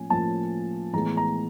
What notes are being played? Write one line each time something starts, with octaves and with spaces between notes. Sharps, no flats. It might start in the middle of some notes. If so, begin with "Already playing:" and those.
Already playing: A2 F3 A#3 C#4 G#5
A2 F3 A#3 C#4 A5
A2 E3 G#3 B3 A#5
A#5